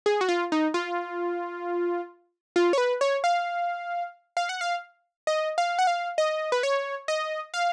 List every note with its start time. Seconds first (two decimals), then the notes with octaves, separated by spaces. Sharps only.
0.06 G#4
0.21 F#4
0.29 F4
0.52 D#4
0.74 F4
2.56 F4
2.73 C#5
2.78 B4
3.01 C#5
3.24 F5
4.37 F5
4.49 F#5
4.61 F5
5.27 D#5
5.58 F5
5.79 F#5
5.87 F5
6.18 D#5
6.52 B4
6.63 C#5
7.08 D#5
7.54 F5